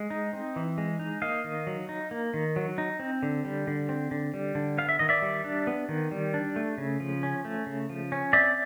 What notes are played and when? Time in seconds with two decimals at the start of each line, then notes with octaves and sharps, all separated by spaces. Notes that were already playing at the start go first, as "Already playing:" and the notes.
Already playing: G#3
0.10 D#4
0.33 C4
0.56 E3
0.78 G#3
0.99 D#4
1.22 A#3 D#5 F5
1.44 D#3
1.67 F#3
1.89 D#4
2.11 A#3
2.34 D#3
2.56 F#3
2.78 D#4
2.99 C4
3.23 D3
3.45 G3
3.67 D3
3.89 C4
4.11 D3
4.34 G3
4.55 D3
4.78 B3 F5
4.89 E5
4.99 D#3 D#5
5.09 D5 E5
5.22 G3
5.44 D4
5.67 B3
5.89 D#3
6.11 G3
6.34 D4
6.56 A3
6.78 C#3
7.00 F3
7.23 C#4
7.45 A3
7.66 C#3
7.90 F3
8.12 C#4
8.33 C4 D5 E5